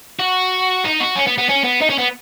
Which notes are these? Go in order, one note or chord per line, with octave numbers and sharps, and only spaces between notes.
F#4
D#4
F#4
C#4
B3
B3
C#4
B3
D#4
C#4
B3